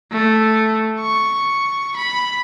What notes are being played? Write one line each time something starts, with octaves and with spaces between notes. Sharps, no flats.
A3
C#6
B5